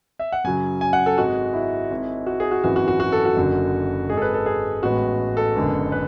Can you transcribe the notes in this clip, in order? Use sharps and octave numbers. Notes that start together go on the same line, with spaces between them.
E5
F#5
F#2 C#3 F#3 G#5
G#5
F#5
A4
G#1 G#2 G#3 F#4
E4
G#1 G#2 G#3
F#4
G#4
F#4
G#1 F#2 E3 F#4
F#4
F#4
F#4
A4
F#4
F#1 F#2 D3 F#3
G#1 G#2 G#3 G#4
A4
B4
A4
G#4
A1 A2 G#3 B3 F#4
A4
F#1 F#2 D3 G#3 B3
B4